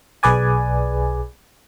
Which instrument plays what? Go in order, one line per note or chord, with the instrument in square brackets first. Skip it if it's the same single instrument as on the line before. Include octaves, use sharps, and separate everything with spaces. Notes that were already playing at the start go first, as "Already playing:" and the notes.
[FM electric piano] B1 G#4 B4 D5 G#5